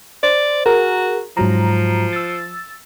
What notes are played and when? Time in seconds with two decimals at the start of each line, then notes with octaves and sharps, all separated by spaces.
0.23 C5 D5
0.66 F#4 G#4 A#4
1.37 G#2 F3 F#3 A#5
2.13 E6 A6